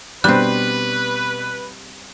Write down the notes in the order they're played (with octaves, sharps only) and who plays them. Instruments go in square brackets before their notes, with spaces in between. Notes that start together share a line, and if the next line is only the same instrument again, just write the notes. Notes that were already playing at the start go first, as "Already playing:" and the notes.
[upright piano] B2 D4 [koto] G3 C4 [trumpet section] B4 [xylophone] F#6